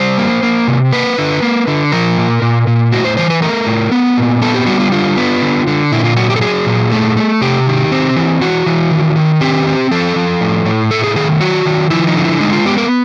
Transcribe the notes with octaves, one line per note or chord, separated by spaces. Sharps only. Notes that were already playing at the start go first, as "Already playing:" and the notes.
Already playing: G3 C5
A#3
A#3
C3
A#3 B4
D3
A#3
D3
F3 A#4
A#2
A#2
A#2
A2 F#4
C5
E3 C5
B4
A3 A#4
A2
B3
A#2
B3 A4
G4
G3 F#4
F4
D3 F4
B3
D3
D3
A#2 E4
F4
F#3 F#4
G4
A4
F#3 G#4
A#2
A3
A3
C3 G4
D#3
C4
E3
E3 F#4
E3
D#3
D#3
C4 G4
C4
F3 A4
F3
A2
A2
A3 A4
G#4
D#3 G#4
F#3 F#4
D#3
F3 E4
D#4
D3
E4
G#3 D#4
F4
B3 G4
A#4